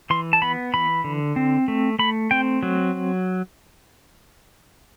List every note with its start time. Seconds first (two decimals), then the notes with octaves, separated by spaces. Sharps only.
0.10 E3 C6
0.33 A5
0.42 B3 B5
0.74 E3 B5
1.04 D3
1.36 C4
1.68 A3
1.99 A3 B5
2.31 C4 G5
2.63 F#3